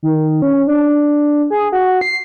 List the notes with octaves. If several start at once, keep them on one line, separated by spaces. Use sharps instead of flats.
D#3
C#4
D4
G#4
F#4
C7